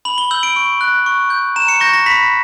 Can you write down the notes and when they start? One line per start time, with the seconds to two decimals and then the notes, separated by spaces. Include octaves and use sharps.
0.05 B5 F#7
0.18 G7
0.31 E6 G6 F#7
0.43 D7
0.56 C#6
0.81 F#6
1.06 C#6
1.30 G6
1.56 A#5 E7
1.68 C#7
1.80 C#6 G6 A#6
1.93 A#6
2.06 B5 B6